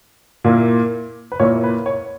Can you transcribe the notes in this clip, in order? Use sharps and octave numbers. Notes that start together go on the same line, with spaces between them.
A#2 A#3 E4
B4
A#2 A#3 E4 C#5
B4
C#5